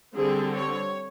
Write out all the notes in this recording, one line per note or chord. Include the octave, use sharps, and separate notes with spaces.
D3 G3 C4 G#4
C#5